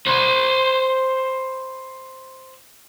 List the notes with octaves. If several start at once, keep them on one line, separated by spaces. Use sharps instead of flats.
C5 B5